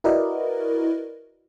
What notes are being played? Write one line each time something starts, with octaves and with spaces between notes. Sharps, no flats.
E4 F#4 A#4 B4 D5 D#5